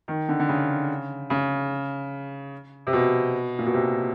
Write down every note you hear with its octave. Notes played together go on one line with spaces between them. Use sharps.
D#3
D3
D3
C#3
C#3
C3
B2
A#2
B2
C3